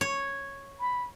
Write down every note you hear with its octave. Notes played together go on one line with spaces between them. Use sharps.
C#5
B5